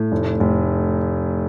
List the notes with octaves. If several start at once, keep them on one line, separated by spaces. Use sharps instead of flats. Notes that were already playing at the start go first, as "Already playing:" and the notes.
Already playing: A2
F1
F1